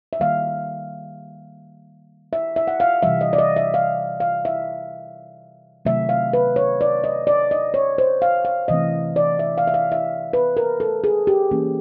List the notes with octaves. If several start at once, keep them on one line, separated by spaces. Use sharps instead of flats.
E5
D#3 G3 A#3 F5
E5
E5
F#5
F5
C3 E3 G3 E5
D#5
D5
D#5
E5
F5
F5
E5
C3 D#3 F#3 A3 C4 E5
F5
B4
C#5
D5
D#5
D5
D#5
C#5
C5
F5
F5
C3 E3 A3 C4 D#5
D5
E5
F5
E5
F5
E5
B4
A#4
A4
G#4
G4
E3 G3 A#3 C#4